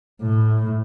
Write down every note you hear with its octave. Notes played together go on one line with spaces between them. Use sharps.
A2